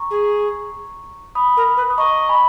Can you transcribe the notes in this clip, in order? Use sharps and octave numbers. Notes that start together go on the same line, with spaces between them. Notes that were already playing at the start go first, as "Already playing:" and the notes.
Already playing: A#5 C#6
G#4
B5 D#6
A#4
B4
D#6
D#5 A#5 C#6
G#5 B5